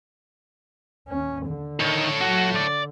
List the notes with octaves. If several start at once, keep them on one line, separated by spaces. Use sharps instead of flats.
D#2 C#4
D3
D#3 A4 C#5
F#3 F#4
D3 D5